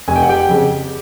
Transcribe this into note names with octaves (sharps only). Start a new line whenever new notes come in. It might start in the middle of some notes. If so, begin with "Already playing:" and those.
F1 G#5
G5
F#5
G4 G5
F2 C#3